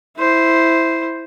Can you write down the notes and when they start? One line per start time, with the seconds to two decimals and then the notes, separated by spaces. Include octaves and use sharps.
0.18 E4 C5